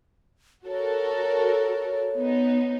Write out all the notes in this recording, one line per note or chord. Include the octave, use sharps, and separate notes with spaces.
F#4 A4 A#4 C#5
B3 D#4